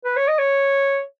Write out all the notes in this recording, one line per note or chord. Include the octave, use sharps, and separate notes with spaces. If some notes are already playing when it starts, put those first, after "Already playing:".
B4
C#5
D#5
C#5